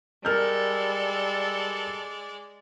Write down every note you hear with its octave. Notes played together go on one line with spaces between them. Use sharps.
G3 G#3 A4 A#4 D5 F6 G6